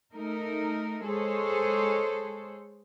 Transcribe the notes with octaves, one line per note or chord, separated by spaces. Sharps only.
A3 D#4 A#4
G#3 G#4 A4 C5 C#5